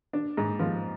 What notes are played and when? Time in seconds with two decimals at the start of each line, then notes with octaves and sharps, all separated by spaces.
0.13 D4
0.37 G#2
0.59 F3